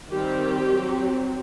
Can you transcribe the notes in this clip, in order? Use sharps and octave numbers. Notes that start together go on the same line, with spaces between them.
D#3 G3 C4 G4
F#3 C4